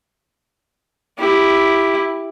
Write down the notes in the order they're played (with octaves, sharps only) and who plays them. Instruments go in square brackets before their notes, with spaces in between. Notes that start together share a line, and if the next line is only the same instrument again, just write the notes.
[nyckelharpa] E4 G4